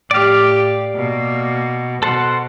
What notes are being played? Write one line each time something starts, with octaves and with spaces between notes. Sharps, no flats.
A2 G4 D5 F5
B2 A#3
B2 A4 C5 F#5